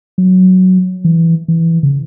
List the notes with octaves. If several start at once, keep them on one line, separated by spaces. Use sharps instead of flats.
F#3
E3
E3
C#3